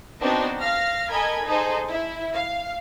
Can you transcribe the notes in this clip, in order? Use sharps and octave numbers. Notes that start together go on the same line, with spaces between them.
B3 C4 D4 D#4 F#4 C5
F5 F6 A#6
A4 A#4 D#5 G#5 B5 G#6
D#4 G#4 A4 C5
E4
F5